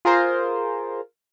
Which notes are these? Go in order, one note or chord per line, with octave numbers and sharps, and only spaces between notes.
F4 G#4 A#4 C5